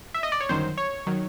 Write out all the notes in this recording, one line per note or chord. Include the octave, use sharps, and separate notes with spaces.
E5
D#5
D5
C#5
G1 F#2 D#3 F#3 C5
C#5
D#3 F#3